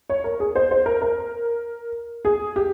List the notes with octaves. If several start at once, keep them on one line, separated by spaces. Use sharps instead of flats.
C#5
A#4
G#4
C5
C5
A#4
A#4
G#4
G4